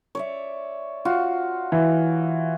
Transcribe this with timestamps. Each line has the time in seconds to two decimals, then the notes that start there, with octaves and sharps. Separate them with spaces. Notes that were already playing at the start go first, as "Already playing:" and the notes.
0.15 C#5 D5 E5
1.05 F4 F#4
1.72 E3